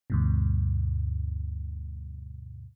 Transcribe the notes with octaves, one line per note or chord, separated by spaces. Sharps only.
D2 G2 B2